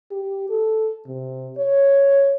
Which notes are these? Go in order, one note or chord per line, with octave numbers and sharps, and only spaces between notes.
G4
A4
C3
C#5